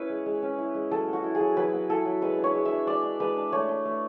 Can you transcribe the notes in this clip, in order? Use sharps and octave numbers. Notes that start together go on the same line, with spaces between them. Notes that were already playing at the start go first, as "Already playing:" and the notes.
Already playing: C#4 E4 B4 C#5
G#3
G#3
C#4
E4
G#3
F#3 A4
B3
F#4
E4
G#4
F#3
F#3 B4
B3
E4 A4
F#3
G#3 B4
D4
C#5
G#3
E5
D4
G#3 D5
D4
G#3 B4
D4
A3 C#5
D4
A3